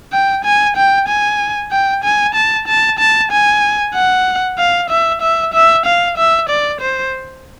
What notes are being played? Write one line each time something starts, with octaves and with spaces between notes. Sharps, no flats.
G5
G#5
G5
G#5
G5
G#5
A5
A5
A5
G#5
F#5
F5
E5
E5
E5
F5
E5
D5
C5